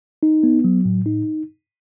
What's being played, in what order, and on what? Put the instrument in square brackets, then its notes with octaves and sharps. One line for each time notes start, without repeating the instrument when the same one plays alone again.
[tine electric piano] D#4
B3
F#3
A2
D#4